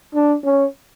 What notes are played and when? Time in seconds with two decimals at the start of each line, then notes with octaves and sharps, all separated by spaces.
0.14 D4
0.44 C#4